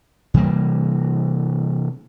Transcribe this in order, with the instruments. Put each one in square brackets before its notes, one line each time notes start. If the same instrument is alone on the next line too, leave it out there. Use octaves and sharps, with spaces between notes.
[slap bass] C3 E3 G3 A#3